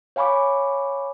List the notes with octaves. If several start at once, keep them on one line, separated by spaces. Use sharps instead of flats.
C#5 F5 G#5 B5 C#6 D6